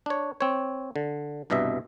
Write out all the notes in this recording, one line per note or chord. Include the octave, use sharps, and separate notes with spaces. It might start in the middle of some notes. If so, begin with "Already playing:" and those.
D4 C#5
C4 C#5
D3
C2 G2 B2 D#5 E5